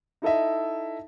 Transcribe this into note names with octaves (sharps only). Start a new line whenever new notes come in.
D#4 E4 A4 D#5 E5